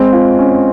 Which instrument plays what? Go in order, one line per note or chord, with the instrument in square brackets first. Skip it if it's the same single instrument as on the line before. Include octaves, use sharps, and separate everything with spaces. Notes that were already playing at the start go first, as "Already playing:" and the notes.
Already playing: [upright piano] G#3 [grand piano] C4
[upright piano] F4
C#4